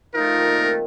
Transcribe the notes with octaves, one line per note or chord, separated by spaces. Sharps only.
F3 A3 D#4 A#4
D#3
A#2
C3